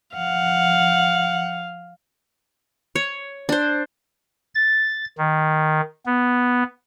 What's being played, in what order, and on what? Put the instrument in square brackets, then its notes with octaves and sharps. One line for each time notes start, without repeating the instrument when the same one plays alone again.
[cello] F3 F#5 [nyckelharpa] F5
[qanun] C#5
D4 C5
[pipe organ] A6
D#3
B3